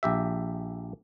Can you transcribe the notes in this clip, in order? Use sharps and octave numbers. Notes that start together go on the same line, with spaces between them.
A#1 G4 E5